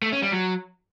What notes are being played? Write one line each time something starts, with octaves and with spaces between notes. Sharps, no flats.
A3
C#4
G3
F#3